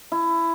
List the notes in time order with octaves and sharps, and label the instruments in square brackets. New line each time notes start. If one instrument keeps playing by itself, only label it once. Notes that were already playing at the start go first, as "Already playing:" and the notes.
[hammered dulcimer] E4